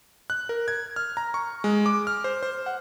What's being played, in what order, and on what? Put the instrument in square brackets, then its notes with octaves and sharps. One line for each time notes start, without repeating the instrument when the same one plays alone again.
[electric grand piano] F#6
A#4
G#6
F6
A#5
C#6
G#3
D6
F6
C5
C5
F#5